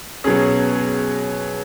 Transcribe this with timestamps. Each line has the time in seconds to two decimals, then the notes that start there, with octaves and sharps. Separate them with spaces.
0.24 B2 F#3 C#4 G#4